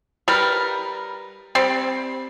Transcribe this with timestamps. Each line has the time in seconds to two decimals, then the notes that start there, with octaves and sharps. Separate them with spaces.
0.28 G3 A#4 B4
1.55 G3 C4